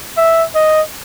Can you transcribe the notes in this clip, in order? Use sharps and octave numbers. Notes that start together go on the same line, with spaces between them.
E5
D#5